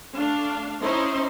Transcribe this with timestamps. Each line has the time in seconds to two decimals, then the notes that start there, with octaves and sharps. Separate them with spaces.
0.16 A3 D4 F5
0.82 C#4 D#4 E4 C5 C6